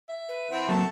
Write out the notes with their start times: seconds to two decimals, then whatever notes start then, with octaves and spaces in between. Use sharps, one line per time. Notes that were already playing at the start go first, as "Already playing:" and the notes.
0.09 E5
0.29 B4
0.51 E3 C4 F#5
0.69 F#3 A3 A#3 C4 A5